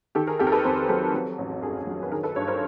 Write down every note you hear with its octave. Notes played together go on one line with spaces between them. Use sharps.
D#3 G4 A4
G#4 A#4
F2 G4 A4
A#4
A4 B4
F2 A#4 C5
F#3 A4 B4
F#3
A1
G2 G#4 A#4
F#3
B4
D#3 G#4 A#4
A4 B4
G2 B4 C#5
A#4 C5